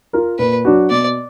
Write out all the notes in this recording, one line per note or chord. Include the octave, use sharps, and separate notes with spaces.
F4 A#4
A#2 B4
F#3 D4 F#4
B2 D5